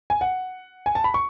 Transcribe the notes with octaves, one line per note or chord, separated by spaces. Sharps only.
G#5
F#5
G#5
A5
B5
C#6